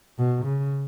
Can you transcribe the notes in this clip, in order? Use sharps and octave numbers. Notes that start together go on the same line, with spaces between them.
B2
C#3